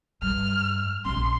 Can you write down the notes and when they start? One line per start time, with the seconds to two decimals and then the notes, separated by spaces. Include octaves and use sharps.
0.22 G2 F6
1.05 A#1 C#4 C6